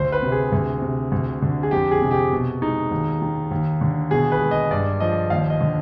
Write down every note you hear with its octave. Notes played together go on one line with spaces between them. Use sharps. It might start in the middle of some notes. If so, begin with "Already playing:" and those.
Already playing: D2 C5
B4
C3
G#4
D2
C3
D2
D3
G#4
F2 G4
G#4
C3
G4
B2
G#3 D#4
D#2
D#3
D#2
D3
B2 G#4
B4
G#3
D#5
G2 D5
F3 D#5
D#2 F5
D#5
D3